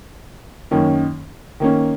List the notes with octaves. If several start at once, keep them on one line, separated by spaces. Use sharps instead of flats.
F#2 D#3 A#3 C#4
D#3 A#3 C#4